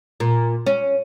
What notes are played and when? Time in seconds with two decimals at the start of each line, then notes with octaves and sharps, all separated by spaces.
0.20 A#2
0.67 C#4